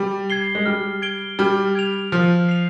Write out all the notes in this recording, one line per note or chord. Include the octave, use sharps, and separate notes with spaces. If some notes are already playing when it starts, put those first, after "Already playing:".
Already playing: G3
G#6 C7 G7
G#3
G3 F6
G#6 D7 G7
G3 F6
G#6 D7 F7
F3 F6
C7 F7